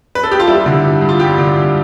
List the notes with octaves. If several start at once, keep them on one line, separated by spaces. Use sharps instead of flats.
B4
A4
G4
F4
G3 E4
D3
G2
G2
F4
G3 G4
D3
G2